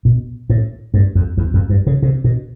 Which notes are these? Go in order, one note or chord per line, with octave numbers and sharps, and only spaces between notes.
B2
A2
G2
F2
E2
F2
G2
C#3
C3
B2